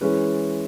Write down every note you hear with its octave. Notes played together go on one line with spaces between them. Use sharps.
E3 G#3 C#4 G#4 B4